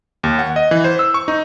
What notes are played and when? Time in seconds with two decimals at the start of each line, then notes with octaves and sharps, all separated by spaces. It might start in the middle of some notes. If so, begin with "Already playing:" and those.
0.23 D#2
0.39 F#5
0.56 D#5
0.71 E3
0.84 C5
0.99 E6
1.14 C#6
1.28 D#4